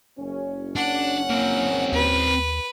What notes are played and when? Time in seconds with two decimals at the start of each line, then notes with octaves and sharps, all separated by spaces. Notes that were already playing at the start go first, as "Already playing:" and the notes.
0.18 F#1 C#4
0.76 D4 F#5
1.30 A#3 C4 A#4
1.92 D#2 B4